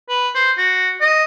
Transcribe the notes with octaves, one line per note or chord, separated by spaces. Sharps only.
B4
C5
F#4
D#5